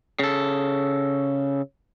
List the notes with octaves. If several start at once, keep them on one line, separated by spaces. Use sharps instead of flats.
C#3 A4